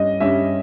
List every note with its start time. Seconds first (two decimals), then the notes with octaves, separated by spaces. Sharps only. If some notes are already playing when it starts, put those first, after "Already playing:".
Already playing: G2 G3 C#4 D#5
0.20 G2 G3 C#4 E5